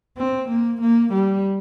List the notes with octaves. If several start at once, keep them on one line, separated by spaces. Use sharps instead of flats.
C4
A#3
A#3
G3